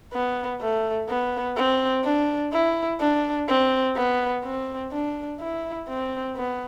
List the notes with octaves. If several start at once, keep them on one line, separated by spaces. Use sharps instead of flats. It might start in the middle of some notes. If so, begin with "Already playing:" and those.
B3
A3
B3
C4
D4
E4
D4
C4
B3
C4
D4
E4
C4
B3